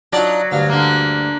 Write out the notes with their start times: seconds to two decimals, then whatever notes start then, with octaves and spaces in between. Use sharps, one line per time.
0.13 F#3 D4 D#4 F4 D5
0.52 D2 G2 F5
0.70 D3 A#3